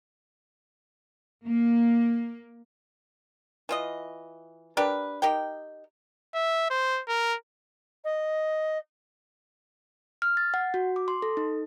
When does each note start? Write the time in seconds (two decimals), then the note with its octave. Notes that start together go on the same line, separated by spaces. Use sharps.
1.46 A#3
3.69 E3 F4 D#5
4.77 D4 G4 A#4 B4
5.22 D#4 G4 A#4 G5
6.34 E5
6.70 C5
7.08 A#4
8.04 D#5
10.22 F6
10.37 A6
10.54 F#5
10.74 F#4
10.96 D6
11.08 C6
11.22 A4
11.37 D#4